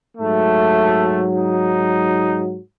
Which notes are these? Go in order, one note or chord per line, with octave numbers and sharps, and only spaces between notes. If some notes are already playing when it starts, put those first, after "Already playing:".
G#2 F#3 A3
D#4